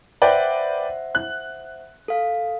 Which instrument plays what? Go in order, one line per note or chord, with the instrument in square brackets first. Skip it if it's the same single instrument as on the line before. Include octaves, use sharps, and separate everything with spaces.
[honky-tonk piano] B4 D5 G5 [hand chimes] C5 E5 F#5
[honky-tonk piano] F#6
[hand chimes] A4 F5